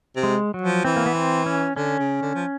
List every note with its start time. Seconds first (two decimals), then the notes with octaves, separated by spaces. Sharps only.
0.16 C3
0.23 G#3
0.54 F#3
0.62 F3
0.84 E3 C4
0.96 A#3
1.06 B3
1.15 C4
1.46 C#4
1.76 D3 C#4
1.99 C#3
2.22 D3
2.34 F3